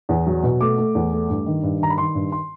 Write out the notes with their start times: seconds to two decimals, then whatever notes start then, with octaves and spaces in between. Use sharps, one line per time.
0.09 E2
0.26 F#3
0.43 B2
0.61 A3 D6
0.78 A3
0.95 E2
1.12 A3
1.29 G2
1.46 D#3
1.63 G2
1.80 D#3 A#5
1.90 B5
1.98 D#3 C6
2.15 G2
2.32 C6